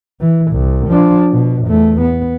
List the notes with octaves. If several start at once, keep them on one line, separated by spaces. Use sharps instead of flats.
E3
C2
F3 D4
B2
E2 A3
B3